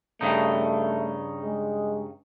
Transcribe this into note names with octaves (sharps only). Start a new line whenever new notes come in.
G2 C#3 A3 D#4
G#3